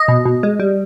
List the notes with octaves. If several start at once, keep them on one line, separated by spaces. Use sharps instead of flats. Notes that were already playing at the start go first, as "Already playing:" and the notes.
Already playing: D#5
B2
B2
G#3
G3